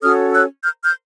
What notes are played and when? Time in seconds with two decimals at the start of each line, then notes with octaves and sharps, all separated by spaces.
0.02 C#4 F#4 A4 C#5 D#6 F6
0.32 E6 F#6
0.63 F6 G6
0.83 F6 G6